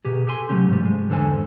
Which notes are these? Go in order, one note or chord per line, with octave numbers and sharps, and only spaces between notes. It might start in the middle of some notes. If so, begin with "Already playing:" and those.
B2 G4 G#4
G4 A4 G#5 C6
C3 F#3 A3 C#4 G4
G#2 F3 G3
G#3
E2 G#2 D3 A4 C5 G#5